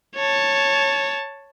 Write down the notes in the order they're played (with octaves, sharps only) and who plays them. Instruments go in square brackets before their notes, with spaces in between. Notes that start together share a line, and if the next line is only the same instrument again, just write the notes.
[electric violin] C#5 A5